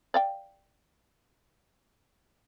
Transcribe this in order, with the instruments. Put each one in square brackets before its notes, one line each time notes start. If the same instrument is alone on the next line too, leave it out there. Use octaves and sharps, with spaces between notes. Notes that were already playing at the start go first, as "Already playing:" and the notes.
[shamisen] D5 F5 G5